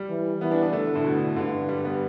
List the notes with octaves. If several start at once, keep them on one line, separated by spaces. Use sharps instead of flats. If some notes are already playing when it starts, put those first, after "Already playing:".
Already playing: G3
E3
E3 B3
D4
D4
D3 A3
A2
B2
G2 D3
G3
B3